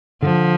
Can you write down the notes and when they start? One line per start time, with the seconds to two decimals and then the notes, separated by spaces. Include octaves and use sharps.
0.22 D3 F3